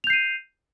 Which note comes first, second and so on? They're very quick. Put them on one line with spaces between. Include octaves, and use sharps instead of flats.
F7 G6 C7 D#7